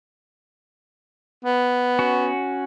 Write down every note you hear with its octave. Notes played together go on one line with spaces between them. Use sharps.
B3
C#4 F#4